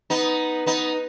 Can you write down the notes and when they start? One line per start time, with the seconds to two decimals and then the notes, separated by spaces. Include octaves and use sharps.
0.10 B3 D#4
0.66 B3 D#4